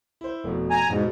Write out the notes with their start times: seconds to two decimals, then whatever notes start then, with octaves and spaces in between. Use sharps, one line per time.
0.21 E4 C5
0.44 F1 B2
0.71 G#5 A#5
0.89 E2 G#2 B2